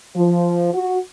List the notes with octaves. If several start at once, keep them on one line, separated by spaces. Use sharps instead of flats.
F3
F#4